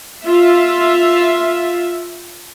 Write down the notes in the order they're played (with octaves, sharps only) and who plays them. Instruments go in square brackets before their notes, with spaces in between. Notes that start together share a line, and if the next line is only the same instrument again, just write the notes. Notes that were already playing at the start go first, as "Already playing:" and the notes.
[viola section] F4 E5